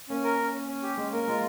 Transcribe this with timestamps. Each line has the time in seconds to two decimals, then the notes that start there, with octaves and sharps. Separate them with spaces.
0.09 A#3 C#4
0.24 A#4
0.39 C#4
0.53 C#4
0.68 C#4
0.83 G4
0.97 G#3 C#4
1.12 A#3 A#4
1.28 G#3 F4